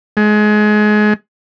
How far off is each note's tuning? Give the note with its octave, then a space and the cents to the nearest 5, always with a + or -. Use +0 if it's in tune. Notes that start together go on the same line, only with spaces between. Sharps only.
G#3 +25